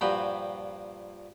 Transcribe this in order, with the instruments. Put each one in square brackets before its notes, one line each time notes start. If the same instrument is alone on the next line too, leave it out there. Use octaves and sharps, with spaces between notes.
[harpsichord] G2 A#2 F3 F#4 G5 B5